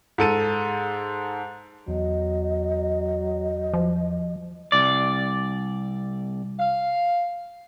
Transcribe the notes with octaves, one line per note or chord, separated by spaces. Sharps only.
G#2 A4 D#7
E2 F#3 D#5
F3
C2 D5
F5